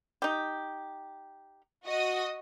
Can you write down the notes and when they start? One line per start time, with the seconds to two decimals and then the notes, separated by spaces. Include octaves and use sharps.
0.22 D#4 G4
1.85 F#4 D#5 D#6